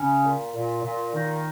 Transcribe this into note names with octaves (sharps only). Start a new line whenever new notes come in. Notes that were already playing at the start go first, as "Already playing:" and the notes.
Already playing: C#3 C#4
A#2
A#2
A#2
A#2 D#3 D#4